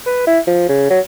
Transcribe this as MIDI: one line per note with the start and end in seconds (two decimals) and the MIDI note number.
0.06 0.23 71
0.27 0.40 64
0.47 0.68 53
0.69 0.89 49
0.90 1.00 54